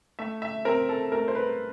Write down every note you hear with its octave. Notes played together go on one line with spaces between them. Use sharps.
A3 E5
E5
C4 A#4
A4
A3 A#4
C5
B4